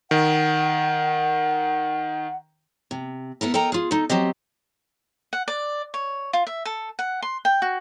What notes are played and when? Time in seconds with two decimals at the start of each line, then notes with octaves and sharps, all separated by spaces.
0.11 D#3 F#5
2.91 C3
3.41 B3 E4 A4 A#4
3.54 A4 A#4 D#5 G5 A#5
3.72 F4 G#4
3.91 D#4 A4
4.09 F#3 C4 G4 D#5
5.33 F#5
5.48 D5
5.94 C#5
6.33 F4
6.47 E5
6.65 A4
6.99 F#5
7.22 C6
7.45 G5
7.62 F#4